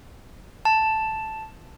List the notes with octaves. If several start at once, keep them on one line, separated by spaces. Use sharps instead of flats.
A5